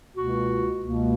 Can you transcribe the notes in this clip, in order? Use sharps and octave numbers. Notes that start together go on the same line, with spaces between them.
C#2 B2 A#3 F#4
C#2 B2 A#3